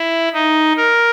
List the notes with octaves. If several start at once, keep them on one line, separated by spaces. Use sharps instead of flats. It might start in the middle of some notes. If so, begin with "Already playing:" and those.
Already playing: E4
D#4
A#4